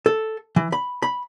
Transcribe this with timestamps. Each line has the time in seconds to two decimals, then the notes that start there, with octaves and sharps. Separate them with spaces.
0.06 A4
0.56 E3
0.72 B5
1.02 B5